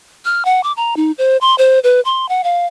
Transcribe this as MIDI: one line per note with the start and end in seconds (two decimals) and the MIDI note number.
0.25 0.45 89
0.45 0.63 78
0.63 0.72 86
0.77 0.96 82
0.97 1.12 63
1.18 1.37 72
1.41 1.55 84
1.58 1.79 72
1.84 2.01 71
2.05 2.28 84
2.29 2.44 78
2.44 2.66 77